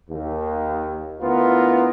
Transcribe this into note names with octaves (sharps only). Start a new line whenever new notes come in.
D#2
D2 B3 E4 F4 A#4